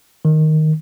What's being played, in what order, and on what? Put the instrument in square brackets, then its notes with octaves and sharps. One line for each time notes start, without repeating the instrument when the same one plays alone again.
[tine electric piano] D#3